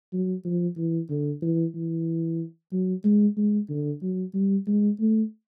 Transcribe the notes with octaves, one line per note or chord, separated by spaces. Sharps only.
F#3
F3
E3
D3
E3
E3
F#3
G#3
G#3
D3
F#3
G3
G#3
A3